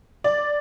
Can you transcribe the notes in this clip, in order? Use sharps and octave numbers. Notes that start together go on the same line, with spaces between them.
D5